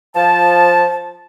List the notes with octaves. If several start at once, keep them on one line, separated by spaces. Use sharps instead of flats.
F3 A5